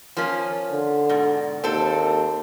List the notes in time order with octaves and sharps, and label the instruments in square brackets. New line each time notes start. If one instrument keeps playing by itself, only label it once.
[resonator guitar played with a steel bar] F3 A#3 C#4
[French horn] D3
[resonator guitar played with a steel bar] G#2 B2
[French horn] D#2 [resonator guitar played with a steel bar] C4 A4